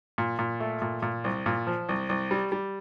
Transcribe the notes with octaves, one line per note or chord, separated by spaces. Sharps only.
A#2
A#2
A3
A#2
A#2
C2
A#2
F3
C2
C2
G3
G3